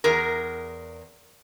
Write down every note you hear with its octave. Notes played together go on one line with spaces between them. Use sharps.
E2 G#4 A#4